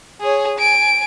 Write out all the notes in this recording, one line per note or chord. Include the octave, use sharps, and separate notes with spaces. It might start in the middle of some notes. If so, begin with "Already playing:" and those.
G#4 C#5
G#5 D7